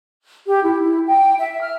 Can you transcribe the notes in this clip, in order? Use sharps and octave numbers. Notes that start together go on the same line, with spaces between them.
G4
E4
E4
G5
E5
F6